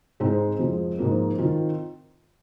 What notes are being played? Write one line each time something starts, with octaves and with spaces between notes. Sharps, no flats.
G#2 G#3 C4 D#4
F2 F3 G#3
G#2 F3 A#3
D#3 C4 F4